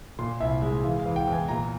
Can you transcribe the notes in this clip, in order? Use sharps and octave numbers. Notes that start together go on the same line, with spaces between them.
A#2 C6
C2 E5
G#3
E3 F5
F5
E2
G5
E2 G#5
A#2 A#5